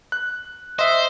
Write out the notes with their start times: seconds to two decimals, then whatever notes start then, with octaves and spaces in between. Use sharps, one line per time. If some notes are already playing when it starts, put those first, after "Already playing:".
0.12 F#6
0.79 C5 D#5 E5